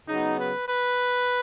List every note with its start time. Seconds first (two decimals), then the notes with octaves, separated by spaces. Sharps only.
0.08 C#3 F#3 B3 D#4
0.39 B4
0.68 B4